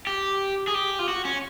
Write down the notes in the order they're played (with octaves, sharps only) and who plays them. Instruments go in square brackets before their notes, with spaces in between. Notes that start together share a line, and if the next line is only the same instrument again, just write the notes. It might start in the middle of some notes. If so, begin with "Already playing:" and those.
[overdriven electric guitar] G4
G#4
G4
F4
F#4
C#4